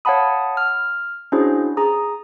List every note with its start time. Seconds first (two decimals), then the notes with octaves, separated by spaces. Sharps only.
0.05 C#5 F5 F#5 A5 B5 D#6
0.57 F6
1.32 C#4 D4 E4 F#4 G#4 C5
1.77 G#4 A#5 D#6